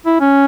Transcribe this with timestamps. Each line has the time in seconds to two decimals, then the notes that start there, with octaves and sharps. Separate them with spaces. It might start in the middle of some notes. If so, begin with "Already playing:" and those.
0.06 E4
0.21 C#4